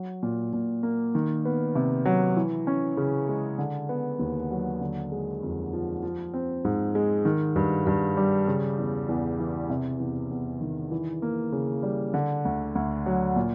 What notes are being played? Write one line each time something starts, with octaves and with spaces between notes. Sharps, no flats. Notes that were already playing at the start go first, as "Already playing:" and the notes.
Already playing: F#3
A#2
A#2
A#3
D#3
B3
C3
F#3
E3
C#4
C#3
G#3
D3
B3
D#2
F#3
D3
G#3
F2
F3
F3
C4
G#2
G#3
D#3
G2
G2
G3
C#3
E2
E2
E3
C3
E2
E2
D#3
E3
A#3
C#3
G3
D3
D2
D2
F#3
A#2